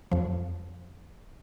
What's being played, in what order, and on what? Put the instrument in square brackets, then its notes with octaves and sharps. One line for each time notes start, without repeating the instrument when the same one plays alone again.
[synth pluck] F2 F3